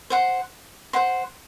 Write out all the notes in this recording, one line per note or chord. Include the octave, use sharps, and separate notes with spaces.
C5 F#5 C6
C5 F#5 C6